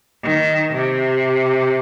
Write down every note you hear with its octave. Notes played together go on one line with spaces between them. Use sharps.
D#3
C3